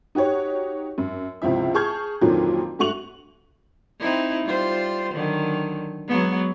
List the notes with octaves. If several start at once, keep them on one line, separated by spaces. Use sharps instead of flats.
D#4 F#4 G4 C#5
F#2
C#2 C3 F3 E4 E5
G#4 A5 C#6 F6 G6 G#6
F2 A#2 D3 D#3 F3 F#3
G2 A3 F#4 C#6 F7 F#7
C4 D#4 E4
G3 F4 C5
D3 D#3 F#3
F#3 G#3 B3